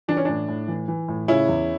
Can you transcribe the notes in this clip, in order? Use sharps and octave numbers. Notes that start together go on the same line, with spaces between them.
E3 D4
C#4
A2 D4
A2
E3
E3
A2
C#3 C#4 E4
E2